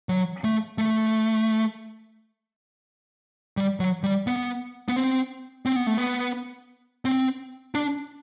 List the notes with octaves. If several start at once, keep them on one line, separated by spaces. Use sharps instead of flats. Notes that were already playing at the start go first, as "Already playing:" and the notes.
F#3
A3
A3
G3
F#3
G3
B3
B3
C4
C4
B3
A3
B3
C4
D4